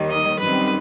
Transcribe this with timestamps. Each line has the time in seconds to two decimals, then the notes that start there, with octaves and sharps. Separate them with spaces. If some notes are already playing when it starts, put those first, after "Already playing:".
Already playing: D#2 D#3 G3
0.10 D#5
0.39 F#2 D#3 G3 C4 B4